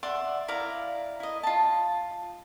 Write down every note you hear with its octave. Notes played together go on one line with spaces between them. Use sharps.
D5 E5 F#5 C6
E4 D5 F5 A#5
E4 D#5
F4 A5